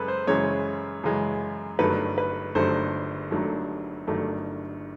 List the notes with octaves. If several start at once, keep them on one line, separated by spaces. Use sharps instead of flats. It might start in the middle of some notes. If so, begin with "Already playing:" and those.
Already playing: F#2 C#3 G#3 A4 B4
C5
F#2 C#3 E3 G#3 C#5
F#2 C#3 E3 G#3
G1 G2 D#3 F#3 A3 B4
B4
G1 G2 D#3 F#3 A3 C5
G1 G2 D#3 F#3 A3
G1 G2 D#3 F#3 A3